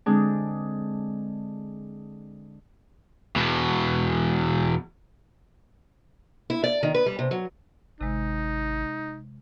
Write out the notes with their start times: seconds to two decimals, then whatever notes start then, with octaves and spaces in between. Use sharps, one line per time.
0.06 D3 G#3 C4 D4
3.36 E2 B2
6.50 E4
6.64 D5
6.83 D#3
6.94 B4
7.06 G3
7.19 C3
7.31 F#3
8.01 G#1 C3 G#3 D#4